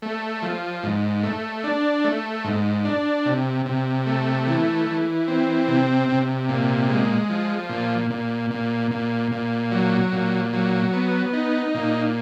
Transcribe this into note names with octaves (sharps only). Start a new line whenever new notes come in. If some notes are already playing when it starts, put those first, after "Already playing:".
A3
F3
G#2
A3
D4
A3
G#2
D4
C3
C3
A3
E3
E3
C4
C3
C3
A#2
G#3
F3
A#2
A#2
A#2
A#2
A#2
F#3
A#2
F#3
B3
D#4
A#2